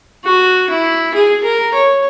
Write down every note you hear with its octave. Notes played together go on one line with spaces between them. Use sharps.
F#4
E4
G#4
A#4
C#5